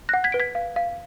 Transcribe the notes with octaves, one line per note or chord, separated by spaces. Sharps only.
F#6 A#6
F#5
G#6 B6
B4 D7
G#6 B6
F5
F5